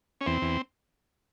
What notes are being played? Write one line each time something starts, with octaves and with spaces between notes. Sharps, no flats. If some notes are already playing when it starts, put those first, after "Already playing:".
C#4
E2 C4
E2